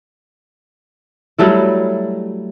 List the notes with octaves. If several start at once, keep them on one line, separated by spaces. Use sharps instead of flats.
F#3 G3 A3 E4